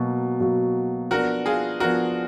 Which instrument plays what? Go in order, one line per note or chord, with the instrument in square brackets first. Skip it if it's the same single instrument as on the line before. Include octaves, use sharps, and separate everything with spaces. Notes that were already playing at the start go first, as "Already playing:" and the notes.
Already playing: [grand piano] B2 F#3 A#3
B2 F#3 A#3
[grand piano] F3 B3 D4 [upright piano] F#4 A#4
[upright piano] F4 G#4
[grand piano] F3 B3 D4 [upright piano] F#4 A#4